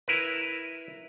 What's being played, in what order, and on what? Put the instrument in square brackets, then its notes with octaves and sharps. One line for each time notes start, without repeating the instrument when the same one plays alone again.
[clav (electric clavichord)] E4 A#4 B4